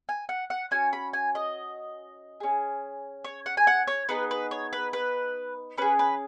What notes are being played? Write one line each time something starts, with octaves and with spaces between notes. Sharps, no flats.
G#5
F#5
F#5
C#4 F#4 G#5
B5
G#5
D#5
C#4 G#4
C#5
F#5
G#5
F#5
C#5
B3 D#4 G#4 B4
B4
C#5
B4
B4
C#4 G#4 B4
B4